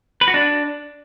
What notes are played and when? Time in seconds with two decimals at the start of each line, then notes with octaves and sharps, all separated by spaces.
0.21 B4
0.28 F#4
0.34 D4